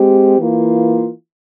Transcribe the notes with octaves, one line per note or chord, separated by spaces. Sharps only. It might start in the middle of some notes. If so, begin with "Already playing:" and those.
Already playing: G#3 C4 G4
E3 A#3 F4